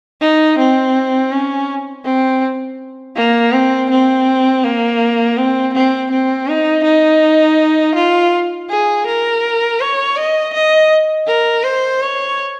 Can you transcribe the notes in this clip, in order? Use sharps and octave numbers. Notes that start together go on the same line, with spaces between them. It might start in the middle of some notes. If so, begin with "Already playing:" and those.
D#4
C4
C#4
C4
A#3
C4
C4
A#3
C4
C4
C4
D#4
D#4
F4
G#4
A#4
C#5
D#5
D#5
A#4
C5
C#5